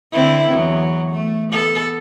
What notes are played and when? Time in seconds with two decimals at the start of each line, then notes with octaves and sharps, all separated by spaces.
0.12 D3 C4 E4
0.51 E2 F#3
1.11 A3
1.52 B3 A4